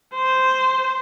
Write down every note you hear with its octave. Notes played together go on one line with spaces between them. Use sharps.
C5